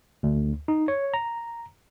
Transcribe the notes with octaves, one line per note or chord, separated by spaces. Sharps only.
D2
D#4
C#5
A#5